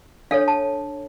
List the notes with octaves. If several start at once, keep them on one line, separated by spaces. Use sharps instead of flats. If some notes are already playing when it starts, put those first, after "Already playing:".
D4 A4 C#5 F5
A5